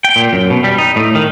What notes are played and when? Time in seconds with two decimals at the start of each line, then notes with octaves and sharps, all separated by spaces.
0.04 G5
0.16 A#2
0.33 F#2
0.50 B2
0.64 G3
0.78 D#4
0.96 A2
1.15 D#3